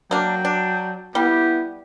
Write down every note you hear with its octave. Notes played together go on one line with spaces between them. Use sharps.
F#3 A#3 D4 G5
D4
G3 B3 E4 G4